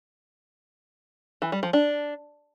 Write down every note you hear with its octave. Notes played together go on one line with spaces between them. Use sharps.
E3
G3
F3
D4